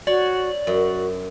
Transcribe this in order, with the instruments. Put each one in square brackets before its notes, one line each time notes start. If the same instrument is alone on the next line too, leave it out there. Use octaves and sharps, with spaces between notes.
[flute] F#4 [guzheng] C#5 [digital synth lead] D5
[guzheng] F#2 [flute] F#4